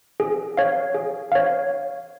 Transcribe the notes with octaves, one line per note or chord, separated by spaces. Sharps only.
G#4
C#5 F5
G#4
C#5 F5